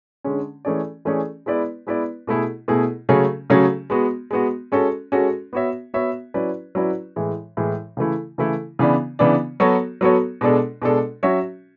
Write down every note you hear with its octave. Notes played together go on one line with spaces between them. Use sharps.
D3 G#3 C#4
E3 A3 C#4 G#4 D5
E3 A3 C#4 G#4 D5
G#3 B3 E4 B4 D5
G#3 B3 E4 B4 D5
B2 A3 E4 G#4
B2 A3 E4 G#4
C#3 F#3 A3 C#4 G#4
C#3 F#3 A3 C#4 G#4
G#3 B3 F#4
G#3 B3 F#4
G#3 C#4 F#4 A4
G#3 C#4 F#4 A4
B3 F#4 C#5 E5
B3 F#4 C#5 E5
F#3 C#4 E4 B4 D5
F#3 C#4 E4 B4 D5
A2 E3 G#3
A2 E3 G#3
C#3 E3 A3 E4
C#3 E3 A3 E4
C#3 E3 B3 D4
C#3 E3 B3 D4
F#3 B3 F#4 A4 C#5
F#3 B3 F#4 A4 C#5
B2 G#3 D4 A4
B2 G#3 D4 A4
F#3 C#4 F#4 C#5 E5